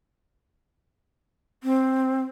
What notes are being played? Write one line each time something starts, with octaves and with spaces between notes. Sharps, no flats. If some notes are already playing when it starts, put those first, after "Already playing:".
C4